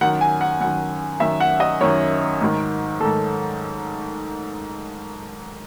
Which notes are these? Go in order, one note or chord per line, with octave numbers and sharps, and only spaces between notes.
F#2 D#3 F#5
G#5
F#5
F#2 D#3 F#5
F#2 D#3 E5
F#5
D#5
F#2 D#3 C#5
G#2 D#3
G#2 D#3 A4